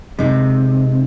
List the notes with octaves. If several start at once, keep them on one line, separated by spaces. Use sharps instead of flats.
C3 G#3 D#4